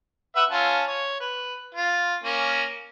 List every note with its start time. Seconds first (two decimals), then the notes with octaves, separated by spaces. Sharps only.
0.36 B4 E5 F#5
0.50 C#4 F4 A5
0.88 C#5
1.20 B4
1.75 F4
2.24 A#3 C#4